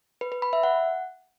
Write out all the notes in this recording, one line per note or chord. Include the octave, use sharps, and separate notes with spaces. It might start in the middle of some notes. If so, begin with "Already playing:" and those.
B4
B4
B5
E5
F#5